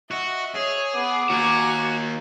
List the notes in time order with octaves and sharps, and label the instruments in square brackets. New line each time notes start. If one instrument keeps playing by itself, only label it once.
[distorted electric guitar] F#4 [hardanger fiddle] D#5 [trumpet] E5
[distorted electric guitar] G#4 [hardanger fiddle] C#5
[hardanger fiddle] B3 [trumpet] D6
[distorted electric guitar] D#2 [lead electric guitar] F#4 [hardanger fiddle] G#5 A#5